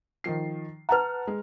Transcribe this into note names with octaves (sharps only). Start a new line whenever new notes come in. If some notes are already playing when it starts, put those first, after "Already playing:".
D#3 F3 C7
B4 F#5 A5 A#5 F6
G#3